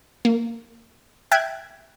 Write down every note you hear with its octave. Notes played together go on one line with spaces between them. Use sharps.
A#3
E5 G5 F#6 G#6